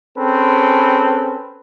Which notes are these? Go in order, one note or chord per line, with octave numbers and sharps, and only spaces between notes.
C4 C#4 G#4 A4 B4